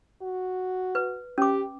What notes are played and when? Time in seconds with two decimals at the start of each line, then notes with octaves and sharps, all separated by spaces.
0.22 F#4
0.95 B4
1.38 C#4 G4 D6